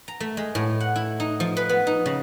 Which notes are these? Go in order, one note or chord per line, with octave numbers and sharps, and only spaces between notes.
A#5
A3
G#3
A2
F#5
E4
D#4
F3
B4
B3
D#4
C#3